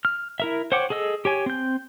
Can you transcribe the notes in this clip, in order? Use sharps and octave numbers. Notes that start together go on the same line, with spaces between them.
F6
E4 A#4 E5
C5 C#5 F#5 G5 D6
G#4 A4 D#5 E6
G4 C#5 G#5
C4 G6